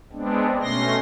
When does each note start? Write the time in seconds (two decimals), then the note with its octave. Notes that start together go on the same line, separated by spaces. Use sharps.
0.12 G#3 B3 C4 D4
0.62 B2 A3 C#4 C6 A#6